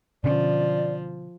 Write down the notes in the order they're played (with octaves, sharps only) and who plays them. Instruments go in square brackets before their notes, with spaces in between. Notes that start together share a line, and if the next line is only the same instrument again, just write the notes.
[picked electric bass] B2 D3 C#4 [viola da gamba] F3 [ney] D5